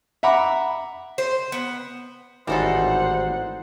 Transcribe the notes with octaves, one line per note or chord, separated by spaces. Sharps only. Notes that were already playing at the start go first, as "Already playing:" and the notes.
E5 F#5 A#5 B5 D6
C5
B3
G#1 A2 E3 G3 D#4 A4 C5 F#5